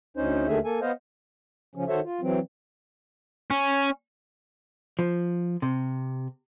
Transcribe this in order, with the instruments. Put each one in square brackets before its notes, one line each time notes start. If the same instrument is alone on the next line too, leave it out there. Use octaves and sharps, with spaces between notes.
[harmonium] D2 C#4 D#4 C5
D#2 D3 D#3 A3 G#4 E5
A#3 A4 G#5
B3 C5 D#5 F5
C#3 F3 C#4
D#3 F#4 A4 C5 C#5 E5
F4
E3 F#3 C4
[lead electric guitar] C#4
[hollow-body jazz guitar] F3
C3